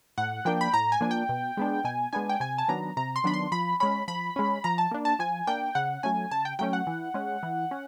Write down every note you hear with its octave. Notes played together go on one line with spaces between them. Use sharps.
A2 F#5
F3 A#3 D4 G5
B5
A2 A#5
G#5
F3 A#3 D4
G5
B2
G#3 B3 D4
B2 G#5
G#3 B3 D4 G#5
G5
C3 G#5
A5
D#3 F#3 B3 D4 A#5
C3 A#5
C6
D#3 F#3 B3 D4 B5
C6
F3 B5
G#3 C#4 B5
F3 B5
G#3 C#4
F3 A#5
A5
A#3 D4
A5
F3 G#5
A#3 D4 G5
C#3 F#5
F#3 A3 C#4 G#5
C#3 A5
G5
F#3 A3 C#4 G5
F#5
E3
G#3 C#4
E3
C#4